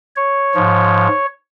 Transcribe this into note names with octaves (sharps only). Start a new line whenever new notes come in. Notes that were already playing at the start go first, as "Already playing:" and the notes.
C#5
G#2 F3